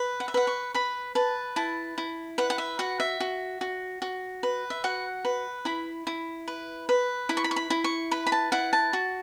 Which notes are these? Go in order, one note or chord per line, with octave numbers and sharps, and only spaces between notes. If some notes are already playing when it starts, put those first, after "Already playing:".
Already playing: B4
F#5
E5
B4 F#5
C#6
B4 B5
B4 A5
E4 A5
E4
B4 F#5
F#5
E5
F#4 F#5
E5
F#4
F#4
F#4
B4
E5
F#4 F#5
B4
E4 B5
E4
B4
B4
E4 B5
C#6
B5
C#6
B5
E4
C#6
B4 B5
B5
A5
E4 F#5
A5
F#4